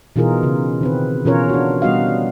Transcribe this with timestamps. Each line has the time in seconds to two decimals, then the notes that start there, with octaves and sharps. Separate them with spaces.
0.16 B2 E3 D#4 F4 G#4 A#4
0.43 C#3
0.81 D#3 C4 B4
1.25 B2 E3 C#4 F4 A#4 C#5
1.49 D4 F#4
1.82 G3 B3 F#4 D#5 F5